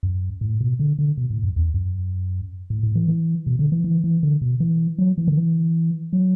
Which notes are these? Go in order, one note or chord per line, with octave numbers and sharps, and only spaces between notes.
F#2
A2
B2
D3
D3
B2
A2
F#2
E2
F#2
A2
A2
E3
E3
B2
D3
E3
E3
E3
D3
B2
E3
F#3
E3
D3
E3
F#3